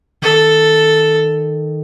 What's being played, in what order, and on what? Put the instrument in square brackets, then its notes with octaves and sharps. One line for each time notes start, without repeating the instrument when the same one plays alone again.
[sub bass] D#3 [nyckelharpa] A4